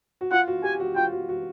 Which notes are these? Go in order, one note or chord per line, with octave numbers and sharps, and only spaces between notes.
F#4
F4 F#5
F#4
G4 G#5
F#4
F4 G5
F#4
F#4